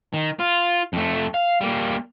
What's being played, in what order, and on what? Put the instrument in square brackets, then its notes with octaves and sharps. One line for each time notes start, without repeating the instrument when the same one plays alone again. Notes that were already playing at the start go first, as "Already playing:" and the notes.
[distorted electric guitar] D#3
F4
F2 A3
F5
G3 A#3